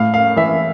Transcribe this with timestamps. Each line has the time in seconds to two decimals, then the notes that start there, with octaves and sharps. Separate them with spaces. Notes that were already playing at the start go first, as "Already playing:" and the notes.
Already playing: A2 F5
0.14 F5
0.36 E3 E5